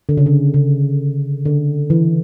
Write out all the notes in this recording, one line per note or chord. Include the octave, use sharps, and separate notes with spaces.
D3
C#3
D3
C#3
D3
E3